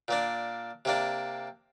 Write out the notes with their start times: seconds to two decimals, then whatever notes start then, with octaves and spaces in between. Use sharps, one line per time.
0.08 A#2 A#3 D4
0.85 C3 A#3 D4